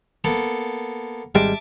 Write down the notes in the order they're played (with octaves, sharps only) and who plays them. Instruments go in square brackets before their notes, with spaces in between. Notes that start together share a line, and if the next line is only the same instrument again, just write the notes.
[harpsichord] A#3 B3 A4
[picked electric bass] G#1 G3 G#3 [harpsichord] E5 A5 D6